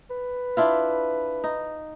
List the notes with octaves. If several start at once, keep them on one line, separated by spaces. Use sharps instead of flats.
B4
D4 E4 F4
D#4